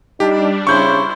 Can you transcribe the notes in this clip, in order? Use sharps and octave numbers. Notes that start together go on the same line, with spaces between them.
G3 D4 D#4 G4
C#3 E4 C5 C#6 G6